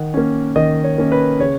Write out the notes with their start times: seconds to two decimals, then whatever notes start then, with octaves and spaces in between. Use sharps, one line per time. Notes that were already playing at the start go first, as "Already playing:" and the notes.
Already playing: D#3 F#5
0.14 A#3 C#4
0.56 D#3 D#5
0.84 C#5
0.98 A#3 C#4
1.12 B4
1.40 C#3 C#5